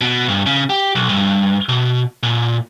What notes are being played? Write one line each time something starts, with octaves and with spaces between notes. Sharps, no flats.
B2
G2
C#3
G4
B1
G2
B2
A#2